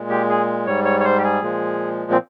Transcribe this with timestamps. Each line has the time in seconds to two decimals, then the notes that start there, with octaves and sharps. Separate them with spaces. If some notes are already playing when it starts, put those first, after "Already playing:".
Already playing: A#2 G#3
0.09 G4
0.29 G#4
0.66 G#2 G3 C#5
0.85 C#5
1.00 C#5
1.04 C5
1.18 G4
1.23 G#4
1.42 A#2 F3 G#3
2.11 C4